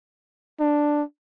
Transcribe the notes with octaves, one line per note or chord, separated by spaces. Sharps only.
D4